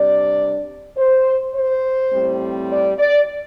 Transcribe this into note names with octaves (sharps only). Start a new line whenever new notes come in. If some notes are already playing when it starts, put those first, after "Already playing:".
Already playing: C3 G3 D4 D5
C5
C5
A2 G3 C4
D5
D5